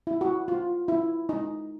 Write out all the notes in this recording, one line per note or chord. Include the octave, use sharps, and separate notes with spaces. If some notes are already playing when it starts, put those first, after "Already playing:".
E4
F#4
F4
E4
D#4